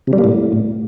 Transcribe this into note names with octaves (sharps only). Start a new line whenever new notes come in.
C3
G3
A#3
A2